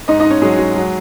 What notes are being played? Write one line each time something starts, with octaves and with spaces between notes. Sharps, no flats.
G#2 D#4 D#5
D#4 D#5
G#2
C#4 C#5
F#3 G#3 G#4
F#3
F#3